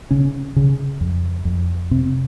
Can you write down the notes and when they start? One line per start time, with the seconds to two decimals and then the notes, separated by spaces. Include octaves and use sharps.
0.11 C#3 C#4
0.56 C#3
1.01 F2
1.45 F2
1.91 C3 C4